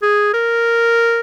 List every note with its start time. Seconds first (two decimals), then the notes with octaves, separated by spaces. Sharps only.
0.02 G#4
0.34 A#4